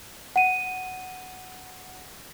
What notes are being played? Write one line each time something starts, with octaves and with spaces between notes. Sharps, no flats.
F#5 D#7